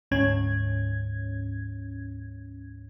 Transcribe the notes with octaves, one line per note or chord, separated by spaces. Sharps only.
D2 G#2 C#4 G#6